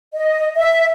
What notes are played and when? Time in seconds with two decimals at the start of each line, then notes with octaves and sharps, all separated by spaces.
0.14 D#5
0.56 E5